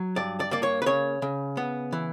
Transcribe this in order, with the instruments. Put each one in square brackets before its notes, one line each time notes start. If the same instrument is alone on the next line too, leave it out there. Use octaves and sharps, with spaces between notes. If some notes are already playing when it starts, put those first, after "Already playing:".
Already playing: [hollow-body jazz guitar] F#3
G2 D5
D5
A#3 D5
C#5
B4
C#3 C#5
C#3
B3
E3